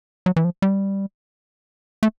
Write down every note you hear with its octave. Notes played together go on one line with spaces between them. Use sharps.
F#3
E3
F3
G3
A3